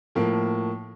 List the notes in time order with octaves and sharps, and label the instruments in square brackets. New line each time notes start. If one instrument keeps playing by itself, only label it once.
[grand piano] A2 F3 A#3